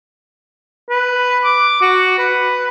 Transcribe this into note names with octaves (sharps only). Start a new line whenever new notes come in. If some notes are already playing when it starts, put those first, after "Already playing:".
B4
D6
F#4
B4